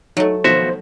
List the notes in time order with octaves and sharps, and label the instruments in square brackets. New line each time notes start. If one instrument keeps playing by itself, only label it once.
[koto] F#3 A3 [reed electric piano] D#4
[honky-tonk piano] B2 D#3 F3 [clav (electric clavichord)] F#4 E5 [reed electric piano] C5